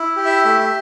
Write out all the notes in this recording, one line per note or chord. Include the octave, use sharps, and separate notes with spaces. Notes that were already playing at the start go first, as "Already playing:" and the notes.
Already playing: E4
G4
E5
A3 E5
E5